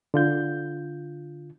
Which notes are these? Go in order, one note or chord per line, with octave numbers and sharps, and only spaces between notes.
D3 F4 G6